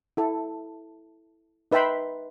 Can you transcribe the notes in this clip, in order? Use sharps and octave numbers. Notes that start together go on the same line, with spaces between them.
E4 A4
D#4 B4 E5 G5 B5 C6